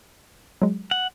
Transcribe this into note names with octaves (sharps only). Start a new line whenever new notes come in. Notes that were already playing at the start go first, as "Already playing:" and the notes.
F#3 G#3
F#5